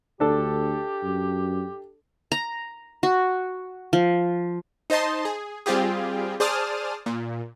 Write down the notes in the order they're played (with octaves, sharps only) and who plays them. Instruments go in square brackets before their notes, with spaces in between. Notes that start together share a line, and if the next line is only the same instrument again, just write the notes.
[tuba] D2 [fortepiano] D4 A4 [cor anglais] G4
[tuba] F#2
[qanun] A#5
F#4
F3
[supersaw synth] D#4 C5 D#5 A5 C6
G#4
G3 C4 F4 G4 G#4
G#4 C5 D5 A5 D#6 F6
A#2